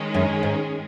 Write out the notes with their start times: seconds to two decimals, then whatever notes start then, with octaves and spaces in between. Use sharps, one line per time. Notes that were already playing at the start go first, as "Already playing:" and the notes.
Already playing: D#3 G#3 C#4 G#4
0.14 F#2
0.43 G#2